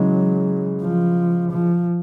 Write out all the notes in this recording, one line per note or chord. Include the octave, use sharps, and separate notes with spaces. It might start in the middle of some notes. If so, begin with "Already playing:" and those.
Already playing: C#3 E3 F#3 G#3
F3
F3